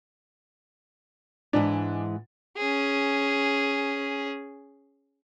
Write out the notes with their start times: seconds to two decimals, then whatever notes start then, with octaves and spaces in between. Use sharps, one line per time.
1.53 G#2 E3 G#3 D4
2.57 C#4 G#4